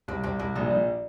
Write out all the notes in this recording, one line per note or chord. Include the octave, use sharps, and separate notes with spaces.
C2 C4
C2 C4
C2 A#3
A#1 G3
A#1